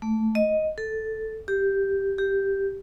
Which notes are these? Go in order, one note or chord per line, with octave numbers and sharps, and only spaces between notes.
A3
D#5
A4
G4
G4